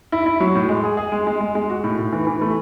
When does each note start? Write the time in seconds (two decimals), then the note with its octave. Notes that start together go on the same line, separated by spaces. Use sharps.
0.12 E4
0.26 E4
0.40 F#3
0.55 A2
0.69 G#3
0.84 G#4
0.97 G#4
1.12 G#3
1.27 G#3
1.41 G#3
1.55 G#3
1.70 F#4
1.84 A2
1.99 A2
2.12 E3
2.27 E3
2.41 A3